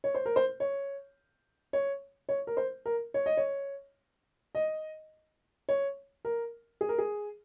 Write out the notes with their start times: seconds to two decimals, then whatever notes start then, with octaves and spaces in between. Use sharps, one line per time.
0.04 C#5
0.15 C5
0.26 A#4
0.36 C5
0.60 C#5
1.73 C#5
2.29 C#5
2.47 A#4
2.57 C5
2.86 A#4
3.14 C#5
3.26 D#5
3.37 C#5
4.55 D#5
5.69 C#5
6.25 A#4
6.81 G#4
6.89 A#4
6.98 G#4